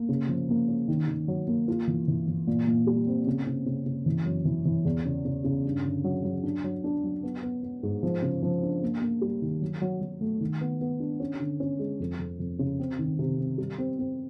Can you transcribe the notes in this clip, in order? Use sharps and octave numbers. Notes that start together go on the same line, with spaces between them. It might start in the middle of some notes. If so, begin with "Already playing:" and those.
Already playing: A#3
C#3
F3
A#3
C#4
D#3
D#3
F#3
A#3
F4
E3
E3
E3
A#2
A#2
G3
C4
C#3
C#3
C#3
C#3
E3
F#2
E3
E3
E2
C#3
C#3
C#3
G2
D3
F#3
F#3
D4
F#3
D4
F#3
B3
B3
B3
G#2
F3
C#3
F3
D4
A#3
A#3
G3
D#3
F#3
F#3
F#3
A3
D#3
B3
B3
D4
C#4
D3
C#4
G#3
F2
F2
F2
C#3
C4
D#3
C3
C4
G3
C4
C4